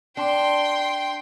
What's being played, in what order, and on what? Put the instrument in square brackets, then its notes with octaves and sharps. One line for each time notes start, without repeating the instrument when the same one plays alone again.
[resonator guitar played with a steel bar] D4 [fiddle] G5 C6